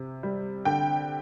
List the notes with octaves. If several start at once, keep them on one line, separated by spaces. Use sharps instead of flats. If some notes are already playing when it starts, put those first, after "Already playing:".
Already playing: C3
G3
D3 G5